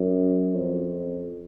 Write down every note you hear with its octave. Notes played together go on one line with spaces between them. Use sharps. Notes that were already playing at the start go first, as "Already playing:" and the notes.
Already playing: F#2
F2